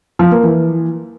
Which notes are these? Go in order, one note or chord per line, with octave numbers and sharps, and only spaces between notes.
F3
A#3
E3